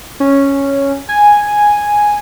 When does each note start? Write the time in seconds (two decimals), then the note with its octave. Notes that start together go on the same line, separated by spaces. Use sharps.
0.20 C#4
1.09 G#5